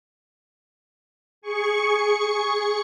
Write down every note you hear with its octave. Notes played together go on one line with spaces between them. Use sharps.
G#4 C#6 C#7